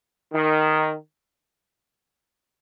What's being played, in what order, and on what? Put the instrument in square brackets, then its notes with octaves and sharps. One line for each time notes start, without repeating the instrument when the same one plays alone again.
[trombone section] D#3